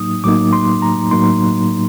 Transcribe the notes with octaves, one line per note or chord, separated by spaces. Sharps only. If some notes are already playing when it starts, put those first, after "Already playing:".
Already playing: A2 F#3 A#3 D#4 D#6
A2 F#3 A#3 D#4 D6
C6
A#5
A2 F#3 A#3 D#4 C6